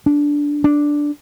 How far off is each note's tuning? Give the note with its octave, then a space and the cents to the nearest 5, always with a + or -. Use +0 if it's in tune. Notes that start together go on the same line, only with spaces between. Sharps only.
D4 -10
D4 +0